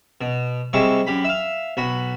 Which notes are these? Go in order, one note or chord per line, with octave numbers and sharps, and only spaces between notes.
B2
C3 G3 G#3 E4 C#6
F#2 G4 B5
E5 F5
B1 F#4 B5